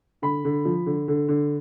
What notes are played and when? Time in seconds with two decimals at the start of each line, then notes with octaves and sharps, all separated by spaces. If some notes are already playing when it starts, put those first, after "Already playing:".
0.22 D3 B5
0.45 D3
0.65 F3
0.86 D3
1.08 D3
1.28 D3